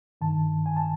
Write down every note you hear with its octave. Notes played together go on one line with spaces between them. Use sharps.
G2 D#3 A5
G#5
A5